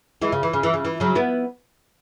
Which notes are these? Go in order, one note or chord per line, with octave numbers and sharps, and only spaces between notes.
E3 G#3
C#3
E3
C#3
E3
C#3
E3
C#3 F#3
B3 E4